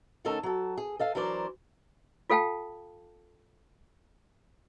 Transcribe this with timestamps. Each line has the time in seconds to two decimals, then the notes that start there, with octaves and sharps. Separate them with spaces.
0.25 D3 A3 C#4 D#4 A4 A#4
0.43 F#3 A4
0.78 G#4
0.99 A4 D#5 F5
1.15 E3 F#3 D4 A#4 C5 D5
2.30 F4 A4 F5 G5 A5